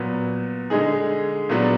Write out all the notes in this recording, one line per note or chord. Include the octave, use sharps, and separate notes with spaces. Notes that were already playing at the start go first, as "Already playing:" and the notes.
Already playing: A#2 F#3 B3
D3 G#3 D#4 G#4
A#2 F#3 B3 D4